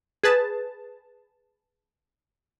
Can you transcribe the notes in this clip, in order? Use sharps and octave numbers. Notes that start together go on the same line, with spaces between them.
G#4 B4 A5